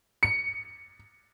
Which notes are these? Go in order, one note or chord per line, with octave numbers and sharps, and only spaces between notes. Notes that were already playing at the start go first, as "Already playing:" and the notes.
C#7